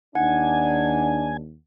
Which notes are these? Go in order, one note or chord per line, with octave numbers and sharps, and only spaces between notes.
D#2 D4 D#4 F#5 G#5